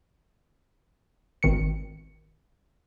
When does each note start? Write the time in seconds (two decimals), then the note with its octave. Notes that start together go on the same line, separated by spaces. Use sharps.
1.43 G#1 D#3 C#7